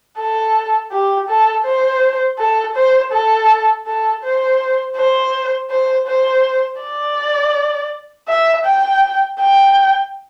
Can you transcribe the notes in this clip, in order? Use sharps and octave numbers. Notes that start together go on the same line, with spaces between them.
A4
G4
A4
C5
A4
C5
A4
A4
C5
C5
C5
C5
D5
E5
G5
G5